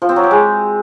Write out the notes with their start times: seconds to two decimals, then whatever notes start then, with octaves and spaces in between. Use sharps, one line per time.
0.02 F3
0.09 C4
0.16 F#3
0.23 G4
0.31 G#3